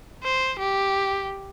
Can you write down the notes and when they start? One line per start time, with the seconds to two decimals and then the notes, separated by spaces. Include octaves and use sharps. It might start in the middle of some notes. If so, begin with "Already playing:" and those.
0.23 C5
0.59 G4